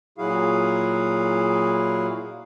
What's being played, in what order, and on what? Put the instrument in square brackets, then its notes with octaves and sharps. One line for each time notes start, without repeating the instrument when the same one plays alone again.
[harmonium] A#2 F#3 E4 F#4 G#4 F5